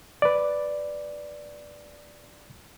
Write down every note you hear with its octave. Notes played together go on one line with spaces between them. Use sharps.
B4 D5